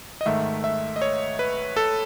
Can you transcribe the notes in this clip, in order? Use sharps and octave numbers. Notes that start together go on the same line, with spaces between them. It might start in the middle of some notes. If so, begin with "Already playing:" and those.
D#5
G#2 D#3 A3 E5
E5
D#5
C#5
B4
A4